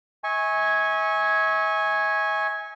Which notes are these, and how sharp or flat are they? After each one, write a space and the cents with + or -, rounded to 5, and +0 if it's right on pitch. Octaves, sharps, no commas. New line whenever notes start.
E5 -40 G#5 +0 C#6 -15